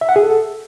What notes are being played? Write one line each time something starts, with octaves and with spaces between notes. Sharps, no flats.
E5
F#5
G#4
A4